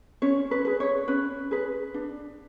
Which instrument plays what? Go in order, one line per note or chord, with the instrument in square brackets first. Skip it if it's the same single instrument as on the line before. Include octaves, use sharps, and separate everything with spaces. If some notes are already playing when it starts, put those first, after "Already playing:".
[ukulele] C#4 C#5
B4
G#4 B4
C#5
C#4 B4
G#4 B4
D4